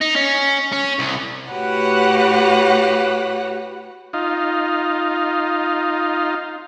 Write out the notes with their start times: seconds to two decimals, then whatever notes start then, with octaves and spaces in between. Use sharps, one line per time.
0.01 D#4
0.16 C#4
0.72 C#4
0.99 C2
1.51 A2 F#4 G4 B4 C#5 F#5
4.13 D#4 F4